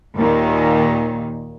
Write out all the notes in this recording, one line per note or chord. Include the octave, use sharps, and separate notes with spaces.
D#2 A#2 D#3